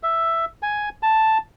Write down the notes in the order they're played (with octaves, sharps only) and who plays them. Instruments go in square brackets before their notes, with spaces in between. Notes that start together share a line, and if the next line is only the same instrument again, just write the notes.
[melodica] E5
G#5
A5